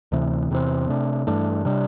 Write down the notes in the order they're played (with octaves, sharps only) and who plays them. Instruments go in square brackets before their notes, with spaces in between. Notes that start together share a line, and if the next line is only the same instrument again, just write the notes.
[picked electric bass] D2 C3 E3
E2 C3 E3 C4
C3 A3 D4
G2 E3 A3 D4
C3 G3 D4